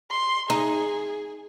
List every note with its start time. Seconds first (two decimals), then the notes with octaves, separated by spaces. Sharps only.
0.11 C6
0.50 D#4 G#4